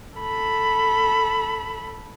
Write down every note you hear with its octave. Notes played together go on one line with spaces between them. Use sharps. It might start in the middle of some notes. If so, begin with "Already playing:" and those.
A4 B5